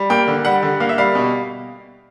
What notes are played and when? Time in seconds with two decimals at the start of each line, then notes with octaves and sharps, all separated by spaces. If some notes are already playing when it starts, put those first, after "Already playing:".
Already playing: G3
0.10 A#3 G5
0.28 D3
0.45 G3 F#5
0.63 D3
0.80 A#3 F5
0.89 E5
0.98 G3 F5
1.15 B2